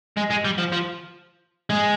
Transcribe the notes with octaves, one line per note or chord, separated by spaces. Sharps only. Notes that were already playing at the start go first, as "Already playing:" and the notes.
G#3
G#3
G3
F3
F3
G#3